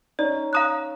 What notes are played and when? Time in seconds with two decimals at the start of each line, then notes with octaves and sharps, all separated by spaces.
0.19 C#4 D#4 D5
0.53 F5 A#5 D#6 F#6